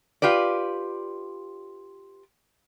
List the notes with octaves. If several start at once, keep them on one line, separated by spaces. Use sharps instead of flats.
F4 G4 B4 D5